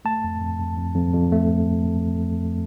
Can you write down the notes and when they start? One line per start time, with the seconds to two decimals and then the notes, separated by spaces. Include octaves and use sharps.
0.05 A3 A5
0.24 F2
0.41 F2
0.60 F2
0.77 F2
0.96 F2
1.14 F2
1.32 A3